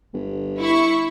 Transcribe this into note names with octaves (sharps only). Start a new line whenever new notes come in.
G1
E4 C#6